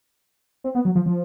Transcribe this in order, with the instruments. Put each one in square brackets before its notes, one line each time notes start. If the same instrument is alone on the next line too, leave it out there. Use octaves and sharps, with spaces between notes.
[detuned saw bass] C4
B3
F#3
F3
F3